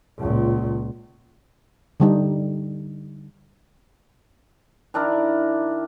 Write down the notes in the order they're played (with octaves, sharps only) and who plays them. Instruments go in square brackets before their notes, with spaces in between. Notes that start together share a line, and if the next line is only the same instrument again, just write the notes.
[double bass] C#2 A#2
[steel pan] D3 G3 D#4
[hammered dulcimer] D#3 D4 E4 A#4